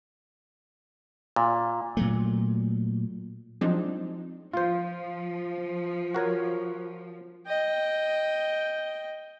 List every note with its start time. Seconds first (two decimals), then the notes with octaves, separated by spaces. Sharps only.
1.36 A#2
1.97 A#2 F#3 A3
3.61 F3 F#3 G#3 C4 D4 D#4
4.54 F3 F4 C5
6.14 F#4 A#4 C#5
7.47 D#5 G5